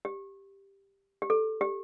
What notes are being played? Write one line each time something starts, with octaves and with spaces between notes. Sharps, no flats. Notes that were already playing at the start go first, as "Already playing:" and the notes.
G4
G4
A4
G4